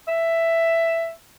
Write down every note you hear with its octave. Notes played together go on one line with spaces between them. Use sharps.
E5